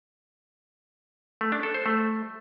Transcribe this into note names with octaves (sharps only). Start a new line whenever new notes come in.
A3
D4
A4
C5
A3